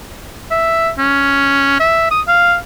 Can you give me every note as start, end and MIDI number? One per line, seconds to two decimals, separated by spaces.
0.51 0.90 76
0.98 1.76 61
1.80 2.08 76
2.11 2.21 87
2.28 2.55 77